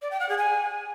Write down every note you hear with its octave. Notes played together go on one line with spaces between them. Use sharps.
D5
G5
F#5
G#4
G#5